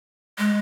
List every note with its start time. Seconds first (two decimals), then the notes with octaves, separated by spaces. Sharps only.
0.38 G#3